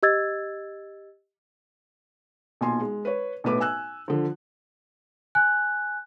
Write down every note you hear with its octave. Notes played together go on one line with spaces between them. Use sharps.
G4 D#5 E6 G#6 A6
B1 A#2 G#5 C6
G#3
B4 C#5
B1 A2 B4 D6
G#5 E6 F#6
D3 F3
G#5 F#6